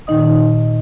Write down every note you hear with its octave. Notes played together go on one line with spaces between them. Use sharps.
A#2 D#3 D#4 D#5 D#6